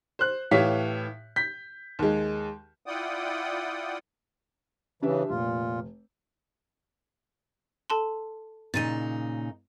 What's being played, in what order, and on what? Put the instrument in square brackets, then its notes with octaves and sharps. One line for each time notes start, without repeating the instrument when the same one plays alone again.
[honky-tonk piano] C5 F#6
A2 E3 G4 C#5 F5 B6
G6 B6
D#2 G#3
[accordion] E4 F4 D5 F#5 G5 D#6
[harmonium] C#3 E3 [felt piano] D4 G4 E5
[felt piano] F1 [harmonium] A#2 F4
[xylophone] A4 A5 C6
[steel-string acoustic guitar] A#2 C#3 D#4 [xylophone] A6 D#7